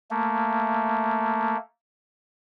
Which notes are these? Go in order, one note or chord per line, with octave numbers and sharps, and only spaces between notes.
A3 A#3